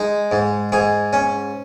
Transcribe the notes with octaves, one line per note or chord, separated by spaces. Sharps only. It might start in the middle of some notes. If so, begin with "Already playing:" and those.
Already playing: G#3 D#4
G#2
G#2 G#4
C#4